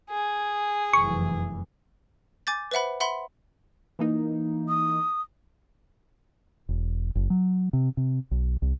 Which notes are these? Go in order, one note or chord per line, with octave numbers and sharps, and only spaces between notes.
G#4
F1 F#2 E3 C#6
G#5 D6 G6 A6
B4 C5 E5 F#5 B5
E5 F#5 B5 C6
E3 A#3 D#4
D#6
E1
F#1
F#3
C3
C3
B1
C2